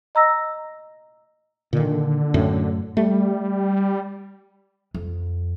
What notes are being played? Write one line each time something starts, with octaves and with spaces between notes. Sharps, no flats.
D#5 A#5 E6 A#6
A#2 D3 D#3
F#2 A2
G3 A3
F2